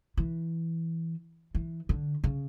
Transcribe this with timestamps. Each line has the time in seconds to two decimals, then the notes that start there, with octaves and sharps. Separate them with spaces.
0.17 E3
1.55 E3
1.89 D3
2.24 C#3